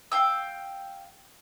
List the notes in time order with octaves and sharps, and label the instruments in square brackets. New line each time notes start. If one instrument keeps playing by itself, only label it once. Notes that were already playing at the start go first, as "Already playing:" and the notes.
[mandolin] F5 G5 E6